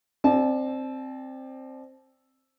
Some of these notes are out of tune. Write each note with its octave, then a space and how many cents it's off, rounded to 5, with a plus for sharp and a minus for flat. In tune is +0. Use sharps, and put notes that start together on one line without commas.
C4 +10 D5 +25 A5 -30